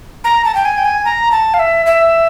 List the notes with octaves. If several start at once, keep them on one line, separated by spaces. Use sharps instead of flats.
A#5
A5
G5
G#5
G5
G#5
A#5
A5
F5
E5
E5